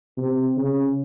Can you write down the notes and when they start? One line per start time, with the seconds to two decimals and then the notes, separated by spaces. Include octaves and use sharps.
0.18 C3
0.57 C#3